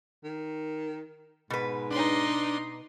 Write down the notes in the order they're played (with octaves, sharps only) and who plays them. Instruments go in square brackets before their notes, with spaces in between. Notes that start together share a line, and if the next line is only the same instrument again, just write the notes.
[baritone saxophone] D#3
[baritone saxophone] G#2 [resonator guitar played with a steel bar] B2 B4
[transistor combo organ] D4 [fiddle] D#4 C6